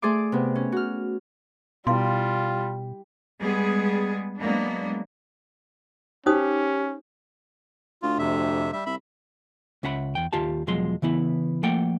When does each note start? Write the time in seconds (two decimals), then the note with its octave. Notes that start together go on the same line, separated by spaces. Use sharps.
0.02 A3 G#4 D5 C6 D6
0.32 C3 B3
0.56 C#4
0.72 F#4 F6
1.87 B2 G3 E4 F4 F5 C6
3.41 G3 G#3 B3 G#4
4.41 F#3 G#3 A#3 B3 D4
6.26 C#4 D#4 G4 C5 D#6
8.02 D2 F4
8.19 F2 C3 E5
8.73 G3 E5
8.86 C2 E5 B5
9.83 C#2 C#4 E5 F#5 B5
10.15 E2 G5
10.33 D#2 F4 G4 A5
10.67 E2 B2 F3 F#3 G#3 C6
11.02 C#3 E3 B3 E4
11.63 F3 A3 A#3 F#5 G5